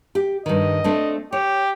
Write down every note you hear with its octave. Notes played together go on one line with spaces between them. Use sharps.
G4
G2 D#3 D#5
A3 C4 D4
G4 C#5